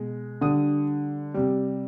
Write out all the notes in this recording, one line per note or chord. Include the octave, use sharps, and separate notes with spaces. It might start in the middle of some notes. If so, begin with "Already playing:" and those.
Already playing: B2 G#3
D3 G3 D#6
C3 G3